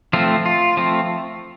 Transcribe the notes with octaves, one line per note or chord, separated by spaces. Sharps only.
F3 A3 C4 F4
F4
F3 A3 C4